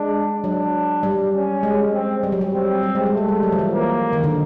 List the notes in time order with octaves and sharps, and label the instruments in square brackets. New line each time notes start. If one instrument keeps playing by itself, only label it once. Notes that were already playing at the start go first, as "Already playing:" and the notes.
Already playing: [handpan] G#3 [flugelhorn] D4
[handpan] F#3 [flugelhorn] D4
[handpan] G3
[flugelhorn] C#4
[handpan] G#3
[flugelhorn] C4
[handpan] G3
F#3
G3
[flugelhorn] C4
[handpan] G3
G#3
G3
[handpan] G#3 [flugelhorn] A3
[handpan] G3
F#3
F3
E3
[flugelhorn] A#3
[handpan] D#3
D3